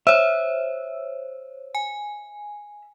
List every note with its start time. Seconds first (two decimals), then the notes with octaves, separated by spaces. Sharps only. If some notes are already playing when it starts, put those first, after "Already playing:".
0.07 C5 C#5 E5
1.75 G#5